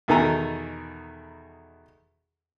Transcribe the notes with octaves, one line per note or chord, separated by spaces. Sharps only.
E2 B2 D#3 A4 G#5 A#5